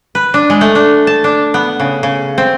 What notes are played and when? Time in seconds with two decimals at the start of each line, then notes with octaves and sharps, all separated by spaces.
0.15 B4
0.34 D4
0.50 G#3
0.61 A3
0.75 D4
1.07 A5
1.24 D4
1.54 B3
1.80 C#3
2.03 C#3
2.38 C4